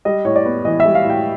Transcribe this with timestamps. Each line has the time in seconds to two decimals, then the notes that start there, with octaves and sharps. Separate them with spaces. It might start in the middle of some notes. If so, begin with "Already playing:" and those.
0.05 G3 D#5
0.25 A2 C#5
0.36 D5
0.46 B3
0.65 E3 D#5
0.80 E5
0.85 G3
0.95 F5
1.05 A2
1.10 G5